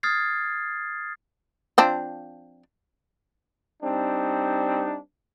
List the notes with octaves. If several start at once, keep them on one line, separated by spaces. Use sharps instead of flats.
D#6 F6 G#6 A6 C7
F3 C4 D4
G3 C4 D4 D#4